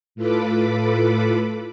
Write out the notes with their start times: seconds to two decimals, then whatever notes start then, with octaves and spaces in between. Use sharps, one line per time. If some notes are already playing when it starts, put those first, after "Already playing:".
0.15 A2 F4 A4 B4 B5 D6